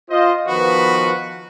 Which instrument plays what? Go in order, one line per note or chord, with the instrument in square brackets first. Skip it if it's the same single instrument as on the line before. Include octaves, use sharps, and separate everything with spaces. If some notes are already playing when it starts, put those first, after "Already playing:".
[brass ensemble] F4 C5 D#5
D#3 F3 B3 F#4 B4